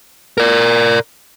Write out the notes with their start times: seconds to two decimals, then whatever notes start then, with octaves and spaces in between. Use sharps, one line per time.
0.38 A#4 D5